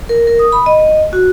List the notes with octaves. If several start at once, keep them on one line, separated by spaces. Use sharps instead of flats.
A#4
A#4
D#6
B5
D#5
F#4